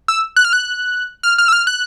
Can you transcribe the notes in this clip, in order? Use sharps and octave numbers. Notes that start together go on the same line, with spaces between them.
E6
F#6
F6
F#6
F6
F6
E6
F6
F#6